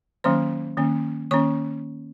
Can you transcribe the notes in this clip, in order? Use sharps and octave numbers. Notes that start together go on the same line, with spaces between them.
D#3 F#3 A#3 C#4 C5 C6
D#3 A#3 C#4
D#3 A#3 C#4 C#5 C#6